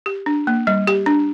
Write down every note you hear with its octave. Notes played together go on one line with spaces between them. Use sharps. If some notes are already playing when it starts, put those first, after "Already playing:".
G4
D4
A#3
G3
G4
D4